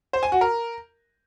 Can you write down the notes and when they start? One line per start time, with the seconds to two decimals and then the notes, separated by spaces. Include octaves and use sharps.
0.13 C5
0.23 G#5
0.32 F#4
0.41 A#4